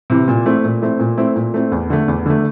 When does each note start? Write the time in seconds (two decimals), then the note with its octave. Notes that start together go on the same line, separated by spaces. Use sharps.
0.10 C3 E3
0.28 A#2
0.46 A3 C4 E4
0.65 A#2
0.82 A3 C4 E4
1.00 A#2
1.17 A3 C4 E4
1.36 A#2
1.54 A3 C4 E4
1.72 E2
1.90 D3 A3
2.08 E2
2.26 D3 A3